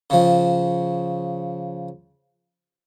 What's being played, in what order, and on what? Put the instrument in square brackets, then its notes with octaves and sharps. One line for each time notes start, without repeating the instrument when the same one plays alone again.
[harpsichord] C#3 F3